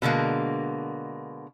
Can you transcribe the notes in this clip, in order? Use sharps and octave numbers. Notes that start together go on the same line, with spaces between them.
B2 D3 G#3 A#3